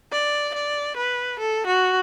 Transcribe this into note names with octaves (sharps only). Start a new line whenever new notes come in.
D5
D5
B4
A4
F#4